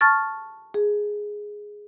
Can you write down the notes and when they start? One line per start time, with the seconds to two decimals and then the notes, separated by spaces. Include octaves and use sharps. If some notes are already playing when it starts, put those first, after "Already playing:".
0.01 A5 C#6 F6 A6
0.74 G#4